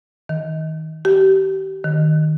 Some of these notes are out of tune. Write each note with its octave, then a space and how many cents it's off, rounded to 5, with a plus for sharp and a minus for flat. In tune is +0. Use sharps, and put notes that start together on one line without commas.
D#3 +25
G4 -30
D#3 -5